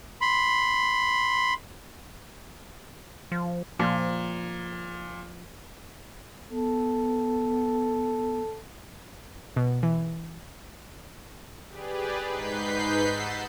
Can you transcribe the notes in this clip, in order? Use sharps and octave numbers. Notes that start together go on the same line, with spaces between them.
B5 C6
F3
A#2 F3
B3 A4
B2
E3
G4 G#4 B4 D5
G#2 D#4 B4 G6 B6 C7
F#5 E6 A6